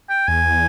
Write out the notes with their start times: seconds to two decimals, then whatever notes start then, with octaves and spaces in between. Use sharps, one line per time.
0.09 G5
0.28 E2 G#5